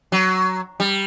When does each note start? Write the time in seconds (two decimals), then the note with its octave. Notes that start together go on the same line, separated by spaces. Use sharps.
0.12 F#3
0.80 G3